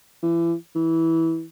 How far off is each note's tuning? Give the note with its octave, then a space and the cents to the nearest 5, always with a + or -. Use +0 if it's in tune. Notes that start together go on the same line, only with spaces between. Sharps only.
E3 +30
E3 -15